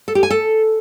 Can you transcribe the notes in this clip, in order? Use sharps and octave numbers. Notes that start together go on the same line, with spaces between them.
A4
G4
G#5
A4